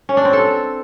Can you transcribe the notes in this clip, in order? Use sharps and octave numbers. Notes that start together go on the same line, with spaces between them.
C#4
D4
C4
A4